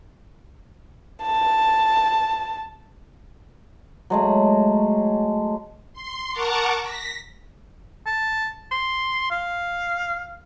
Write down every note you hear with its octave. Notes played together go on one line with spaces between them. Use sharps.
A5
F#3 G#3 A3
C6
A#4 F#5 A5 A#5 C#6 D6
A#6 B6
A5
C6
F5